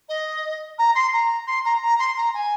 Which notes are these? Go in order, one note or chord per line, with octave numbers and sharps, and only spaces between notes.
D#5
A#5
C6
A#5
C6
A#5
A#5
C6
A#5
G#5